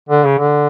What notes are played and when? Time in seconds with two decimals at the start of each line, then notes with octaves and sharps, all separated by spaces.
0.09 D3
0.25 C#3
0.39 D3